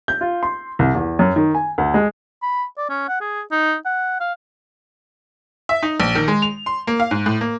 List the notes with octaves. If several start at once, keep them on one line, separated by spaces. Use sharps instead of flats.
G6
F4
C6
C2
E2
F#2
D#3
G#5
D2
G#3
B5
D5
C#4
F#5
G#4
D#4
F#5
F5
E5
D#4
A#1
D#3
G#3
F7
C6
A#3
F5
G#2
A2
A#3